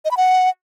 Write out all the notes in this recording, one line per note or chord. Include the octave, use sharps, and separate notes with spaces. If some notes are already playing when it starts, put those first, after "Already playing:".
D#5
B5
F#5